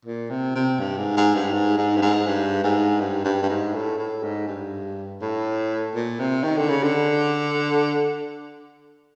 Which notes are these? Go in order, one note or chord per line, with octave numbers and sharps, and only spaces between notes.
A#2
C3
C3
G2
G#2
G#2
G2
G#2
G#2
G2
G#2
G2
G#2
G2
G2
G2
G#2
A2
A2
G#2
G2
A2
A#2
C3
D#3
D3
C#3
D3